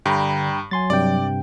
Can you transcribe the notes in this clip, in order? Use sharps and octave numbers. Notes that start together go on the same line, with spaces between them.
G2 D3 G5 A#5 B5
F#3 G#5 C6 A6
G2 C3 D5 G5